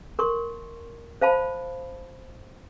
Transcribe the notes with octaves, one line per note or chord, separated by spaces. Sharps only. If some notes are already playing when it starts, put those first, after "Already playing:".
A#4 C6 C#6
C5 F5 A5 B5